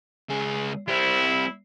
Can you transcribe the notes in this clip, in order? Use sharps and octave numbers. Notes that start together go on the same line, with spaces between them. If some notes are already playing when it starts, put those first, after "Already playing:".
C#2 G#4
G3 C4 E4